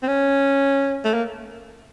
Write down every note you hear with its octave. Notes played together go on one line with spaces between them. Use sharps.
C4
C#4
A3
A#3